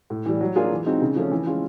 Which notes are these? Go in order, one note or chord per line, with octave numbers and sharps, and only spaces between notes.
A2
E3 G3
F#3
A#3 D4 F4 G#4
E3
G#3 C4 D#4 F#4
C#3
F3 A3 C#4
E3
G#3 C#4 F4